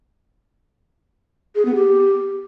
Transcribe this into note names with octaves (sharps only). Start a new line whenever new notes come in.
G#4
B3
G4